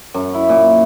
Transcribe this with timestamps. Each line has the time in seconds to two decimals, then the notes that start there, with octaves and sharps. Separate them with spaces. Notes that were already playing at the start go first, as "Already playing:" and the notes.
0.14 F#2
0.34 E4
0.49 A#2